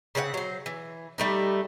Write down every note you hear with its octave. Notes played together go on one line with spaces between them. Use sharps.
C#3 C4 C5 F#5
F#3 C5
E3
G3 A3 D#4